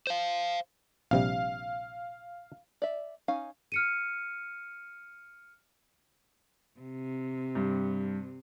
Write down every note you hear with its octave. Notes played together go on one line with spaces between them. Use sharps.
C5 F5
A#1 C3 G3 F5
D5 E5
C#4 D#4 F5 G#5
F6 C#7 D#7
C3
G2